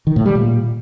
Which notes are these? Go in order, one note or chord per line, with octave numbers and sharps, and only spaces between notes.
D#3
A2
G3
A#2